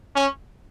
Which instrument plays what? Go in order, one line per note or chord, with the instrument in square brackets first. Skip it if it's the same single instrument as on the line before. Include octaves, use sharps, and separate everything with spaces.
[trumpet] C#4